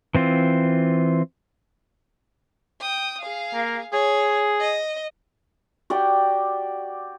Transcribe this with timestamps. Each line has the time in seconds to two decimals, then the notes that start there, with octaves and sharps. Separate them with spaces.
0.15 E3 C4 F4
2.81 G5 D#6
3.22 G#4 F5
3.54 A#3
3.93 G#4 C#5
4.61 D#5
5.90 F#4 G4 D5 G5